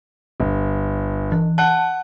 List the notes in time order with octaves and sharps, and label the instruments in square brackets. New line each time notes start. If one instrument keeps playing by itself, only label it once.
[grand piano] G1
[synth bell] E3
[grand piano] F#5 F#6 [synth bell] A5